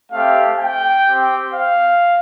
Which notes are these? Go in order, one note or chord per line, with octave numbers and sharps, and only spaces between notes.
A3 C4 G4 F5
G5
C4 G4
F5